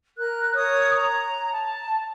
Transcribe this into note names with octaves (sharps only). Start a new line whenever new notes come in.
A#4 F#6
A#4 C#5 D#6
A#5
A5